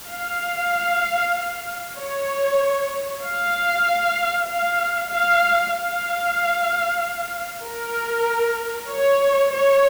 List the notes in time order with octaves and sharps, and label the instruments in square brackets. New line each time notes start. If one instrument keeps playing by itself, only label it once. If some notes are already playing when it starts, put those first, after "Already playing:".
[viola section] F5
C#5
F5
F5
F5
F5
A#4
C#5
C#5